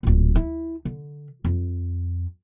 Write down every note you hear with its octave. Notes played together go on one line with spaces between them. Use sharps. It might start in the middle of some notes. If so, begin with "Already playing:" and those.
D1 A#2
E4
D3
F2